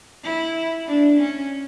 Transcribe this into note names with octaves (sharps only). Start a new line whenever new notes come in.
E4
D4
C#4